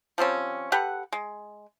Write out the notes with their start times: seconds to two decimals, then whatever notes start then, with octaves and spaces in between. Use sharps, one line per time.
0.18 F3 G3 C4 C#4
0.72 G4 A4 B4 F#5
1.12 G#3